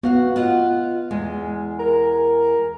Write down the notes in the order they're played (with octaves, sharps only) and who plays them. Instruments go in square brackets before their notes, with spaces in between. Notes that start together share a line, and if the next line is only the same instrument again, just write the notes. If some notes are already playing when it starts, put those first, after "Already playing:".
[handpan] B3 [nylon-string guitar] F#4 F5 F#5
[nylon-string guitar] F4 D#5 F#5
E2 G#3
[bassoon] A#4